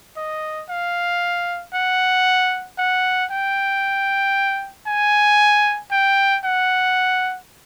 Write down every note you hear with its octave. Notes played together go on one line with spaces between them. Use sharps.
D#5
F5
F#5
F#5
G5
G#5
G5
F#5